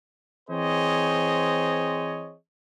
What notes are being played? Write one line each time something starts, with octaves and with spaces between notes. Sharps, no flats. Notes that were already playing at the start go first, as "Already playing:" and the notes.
E3 C4 G#4 C5 C#5 D#5